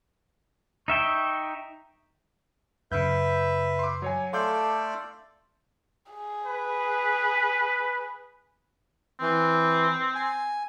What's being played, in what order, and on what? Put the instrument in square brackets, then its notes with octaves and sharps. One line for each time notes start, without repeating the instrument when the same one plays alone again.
[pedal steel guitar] D#4 E5 G5 [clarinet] C#6
[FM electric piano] F#2 C#3 [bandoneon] B4 E5 [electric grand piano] G6
[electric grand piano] C6 D6
F#3 C#5 G#5
[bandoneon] A3 A4 D5 [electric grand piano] F5 D6 G6 [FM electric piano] C6
[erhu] G#4
[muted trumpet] B4
[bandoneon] E3 [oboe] C4
[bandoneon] G#5